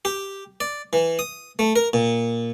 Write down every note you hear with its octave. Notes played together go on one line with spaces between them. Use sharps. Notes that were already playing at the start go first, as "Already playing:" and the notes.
G4
D5
E3
D#6
A3
A#4
A#2